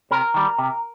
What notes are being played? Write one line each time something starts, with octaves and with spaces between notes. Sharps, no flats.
C3 A#4
D#3 G3
C3